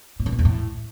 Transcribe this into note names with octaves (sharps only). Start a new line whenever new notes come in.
A#2
C#3
A#2
E2
A2